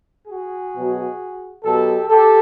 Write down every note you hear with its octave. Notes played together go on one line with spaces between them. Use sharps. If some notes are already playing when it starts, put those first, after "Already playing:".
F#4 G#4
B2 F#3
B2 F#3 G4 A4
G4 A4